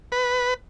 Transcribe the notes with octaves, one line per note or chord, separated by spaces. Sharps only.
B4